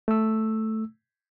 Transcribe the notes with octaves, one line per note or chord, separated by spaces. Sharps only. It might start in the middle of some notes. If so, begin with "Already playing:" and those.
A3 E6